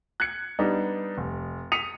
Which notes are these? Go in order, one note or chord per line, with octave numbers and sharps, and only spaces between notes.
F#6 G#6 C#7
G3 B3 D4 D#4
F1
D#6 B6 C#7 D#7 F7